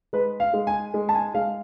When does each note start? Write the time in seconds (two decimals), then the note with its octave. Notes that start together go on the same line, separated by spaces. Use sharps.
0.13 G#3 B4
0.40 F5
0.54 G#3
0.67 G#5
0.94 G#3
1.09 A5
1.15 G#5
1.34 G#3 F5